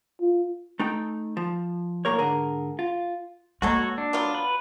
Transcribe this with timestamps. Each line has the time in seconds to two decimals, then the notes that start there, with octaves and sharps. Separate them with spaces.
0.21 F4
0.79 A3 D#4 G5
1.37 F3
2.05 B1 A2 A#3 A#4 C#5
2.19 G#2 D3 G#4 A#4
2.79 F4
3.62 B2 F#3 G#3 A#3 F#4 A4 C#5
3.98 D4
4.13 F#3 B3 F4
4.35 B4